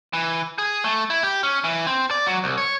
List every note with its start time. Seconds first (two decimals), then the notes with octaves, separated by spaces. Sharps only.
0.13 E3
0.58 G#4
0.84 A3
1.10 E4
1.23 G4
1.43 C#4
1.64 E3
1.87 C4
2.11 D5
2.26 F#3
2.44 C2
2.58 C#5